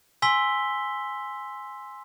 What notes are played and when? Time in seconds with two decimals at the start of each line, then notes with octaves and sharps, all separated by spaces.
0.22 G#5 C6 E6 B6 G7